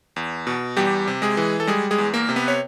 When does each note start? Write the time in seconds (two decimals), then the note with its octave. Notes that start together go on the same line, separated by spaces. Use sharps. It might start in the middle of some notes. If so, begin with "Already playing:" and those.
0.16 E2
0.47 B2
0.77 E2 G3 G4
1.07 C3
1.22 G#3 G#4
1.37 E3
1.60 A4
1.67 G3 G#3 G#4
1.91 G#3 G#4
1.98 E2
2.14 A#3 A#4
2.29 C3
2.36 B3 B4
2.48 C#5